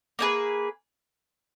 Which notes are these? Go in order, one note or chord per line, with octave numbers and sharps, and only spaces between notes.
A#3 D#4 G#4 B4